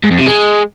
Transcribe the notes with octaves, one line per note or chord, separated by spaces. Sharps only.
G#2
F2
C3
G#3